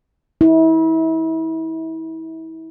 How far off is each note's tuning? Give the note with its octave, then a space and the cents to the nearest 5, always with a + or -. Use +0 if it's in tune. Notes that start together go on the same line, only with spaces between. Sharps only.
E4 -35